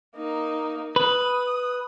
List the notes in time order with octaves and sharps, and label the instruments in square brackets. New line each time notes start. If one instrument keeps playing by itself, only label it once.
[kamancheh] A#3 D#4
[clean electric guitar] B4 [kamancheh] D#6